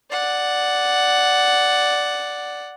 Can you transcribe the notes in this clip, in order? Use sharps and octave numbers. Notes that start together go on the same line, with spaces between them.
D5 F#5